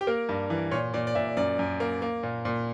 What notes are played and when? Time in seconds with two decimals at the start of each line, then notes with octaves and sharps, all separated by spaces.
0.01 G4
0.07 A#3 A#4
0.29 G2
0.50 E3
0.71 A#2 C#5
0.94 A#2 D5
1.07 D5
1.15 A#2 E5
1.37 F#2 D5
1.59 F#2
1.80 A#3
2.02 A#3
2.23 A#2
2.45 A#2